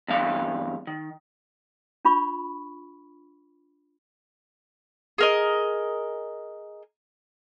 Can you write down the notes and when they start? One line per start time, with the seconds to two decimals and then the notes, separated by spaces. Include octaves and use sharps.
0.08 E2 G2 F5
0.87 D#3
2.05 D4 F4 B5 C#6
5.18 G#4 A#4 D#5